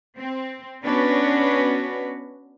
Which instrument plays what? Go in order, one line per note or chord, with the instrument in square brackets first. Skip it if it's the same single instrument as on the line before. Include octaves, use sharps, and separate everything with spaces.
[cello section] C4
B3 C#4 D4 F#4 B4